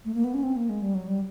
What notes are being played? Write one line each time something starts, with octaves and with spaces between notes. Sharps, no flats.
A3
A#3
B3
C#4
C4
A#3
G#3
G3
F#3
G3